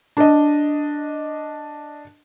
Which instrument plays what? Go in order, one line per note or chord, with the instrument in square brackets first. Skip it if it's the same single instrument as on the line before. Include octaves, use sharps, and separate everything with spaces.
[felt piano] D4 D#5